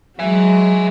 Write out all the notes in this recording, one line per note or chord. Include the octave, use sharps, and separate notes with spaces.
F#3 G#3 E5 G#5